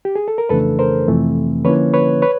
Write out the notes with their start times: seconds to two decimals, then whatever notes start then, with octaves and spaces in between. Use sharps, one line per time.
0.05 G4
0.16 G#4
0.28 A4
0.38 A#4
0.49 F2 C#3 E3 A3 D4 A4 B4
0.79 A#4 C5
1.08 F2 C3 E3 A3 C4
1.64 D3 F3 A#3 C#4 E4 B4 C#5
1.94 B4 C#5
2.22 B4 C#5